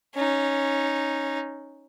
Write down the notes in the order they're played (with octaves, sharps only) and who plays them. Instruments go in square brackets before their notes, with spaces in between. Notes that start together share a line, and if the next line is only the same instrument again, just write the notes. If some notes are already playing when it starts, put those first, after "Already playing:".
[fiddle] C#4 D#4